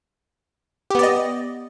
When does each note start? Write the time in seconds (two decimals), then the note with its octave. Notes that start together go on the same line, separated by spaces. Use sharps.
0.90 G4
0.95 B3
0.99 D5
1.03 D#5